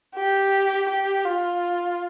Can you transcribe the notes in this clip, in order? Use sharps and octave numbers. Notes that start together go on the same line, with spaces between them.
G4
G4
F4